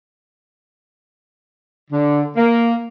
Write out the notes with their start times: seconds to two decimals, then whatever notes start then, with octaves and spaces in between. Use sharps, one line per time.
1.90 D3
2.36 A#3